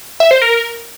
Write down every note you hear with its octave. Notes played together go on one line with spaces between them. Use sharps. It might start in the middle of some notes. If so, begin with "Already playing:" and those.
E5
C5
A#4